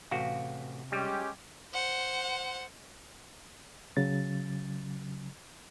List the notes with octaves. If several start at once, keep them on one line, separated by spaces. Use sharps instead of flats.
A1 C3 F#4 F5
G3 G#3 C#4 G4
C5 F#5
C#3 F#3 A6